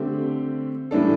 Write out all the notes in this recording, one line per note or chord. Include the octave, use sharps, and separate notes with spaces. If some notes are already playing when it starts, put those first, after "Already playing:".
Already playing: D3 A3 C4 G4
A2 E3 G3 D4 A4